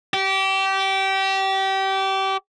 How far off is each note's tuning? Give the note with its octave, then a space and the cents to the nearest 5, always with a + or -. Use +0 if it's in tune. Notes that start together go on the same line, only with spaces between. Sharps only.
G4 -25